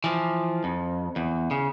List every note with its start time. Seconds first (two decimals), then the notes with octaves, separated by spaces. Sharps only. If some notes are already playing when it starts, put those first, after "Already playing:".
0.04 E3 F3
0.64 F2
1.16 E2
1.51 C#3